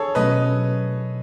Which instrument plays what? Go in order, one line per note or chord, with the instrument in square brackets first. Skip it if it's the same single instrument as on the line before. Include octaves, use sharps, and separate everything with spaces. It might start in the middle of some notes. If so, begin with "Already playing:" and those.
Already playing: [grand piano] G#4 A4 C#5
[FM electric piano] B2 F#3 A3 C#4 [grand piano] B4 D#5